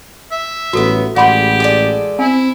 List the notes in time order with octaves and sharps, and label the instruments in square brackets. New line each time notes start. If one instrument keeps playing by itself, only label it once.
[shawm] E5
[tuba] A1 [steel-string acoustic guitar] F#3 B3 [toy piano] F#4 A4
[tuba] A1 [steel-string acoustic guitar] G#3 D5 [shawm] G4 [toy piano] F#5 B5 C6
[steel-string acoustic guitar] G#3 A4 D5 [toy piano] G#4
[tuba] C4 [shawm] E4 [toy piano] G#5